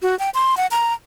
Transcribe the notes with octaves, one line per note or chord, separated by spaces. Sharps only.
F#4
G5
C6
F#5
A#5